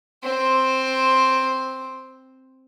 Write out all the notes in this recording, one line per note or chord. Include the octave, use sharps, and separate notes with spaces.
C4 C5